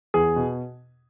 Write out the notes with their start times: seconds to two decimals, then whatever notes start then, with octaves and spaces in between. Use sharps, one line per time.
0.14 E2 G#4
0.36 B2